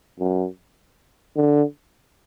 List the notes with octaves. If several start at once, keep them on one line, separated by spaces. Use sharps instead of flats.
F#2
D3